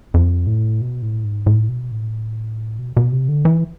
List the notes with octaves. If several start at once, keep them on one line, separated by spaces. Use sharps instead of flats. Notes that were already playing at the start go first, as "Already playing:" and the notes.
F2
A2
B2
A2
G#2
A2
B2
A2
B2
B2
C3
D3
E3